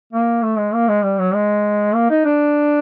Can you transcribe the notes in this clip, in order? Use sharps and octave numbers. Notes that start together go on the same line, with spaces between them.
A#3
A3
G#3
A#3
G#3
G3
F#3
G#3
A#3
D#4
D4